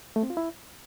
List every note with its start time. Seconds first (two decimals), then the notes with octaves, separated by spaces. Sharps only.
0.16 A3
0.23 C4
0.30 F4
0.37 E4